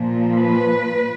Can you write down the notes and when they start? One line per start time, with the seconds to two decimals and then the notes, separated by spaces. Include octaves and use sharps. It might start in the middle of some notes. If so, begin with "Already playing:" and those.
Already playing: A#2 F3
0.34 B4